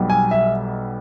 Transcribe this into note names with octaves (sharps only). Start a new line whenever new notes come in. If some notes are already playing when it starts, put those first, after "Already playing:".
Already playing: B1 B2 G3
G#5
E5